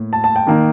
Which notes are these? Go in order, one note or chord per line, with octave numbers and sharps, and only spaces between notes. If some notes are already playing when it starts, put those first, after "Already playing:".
Already playing: A2 A#3
A5
A5
G5
D#3 A#3 D#4